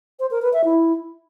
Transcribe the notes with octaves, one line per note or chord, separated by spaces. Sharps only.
C5
A#4
B4
E5
E4